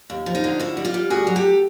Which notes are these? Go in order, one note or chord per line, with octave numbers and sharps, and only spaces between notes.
D#2
F3
D#4 F4
D3
D#2 E4 F#4
G3
F4 G4
G3
D2 F#4 G#4
F#3
G4 A4